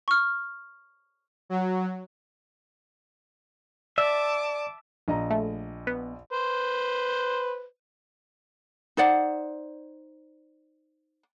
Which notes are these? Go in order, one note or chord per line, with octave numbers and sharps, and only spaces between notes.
C#6 F6
F#3
D5 E5 A5 D6
A#1 D#5 A#5
A3
B3
B4 C5
D#4 C5 D5 F#5